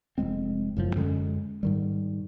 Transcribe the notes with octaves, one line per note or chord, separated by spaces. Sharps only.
F1 F#2 G#3 C4
F#1 F#2 A2 F3
F#2 D3 G#3 C#4
G#2 D#3 G3